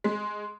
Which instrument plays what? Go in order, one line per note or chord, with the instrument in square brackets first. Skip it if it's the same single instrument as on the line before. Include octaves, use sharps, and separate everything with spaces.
[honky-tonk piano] G#3